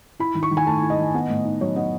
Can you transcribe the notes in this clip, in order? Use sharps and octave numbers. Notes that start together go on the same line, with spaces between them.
E4 B5
D#3
C#6
D#3
G#5
A3 A5
E4
D#5
D#3
B3
A2
D#4
F#3 C#5
B3 D#5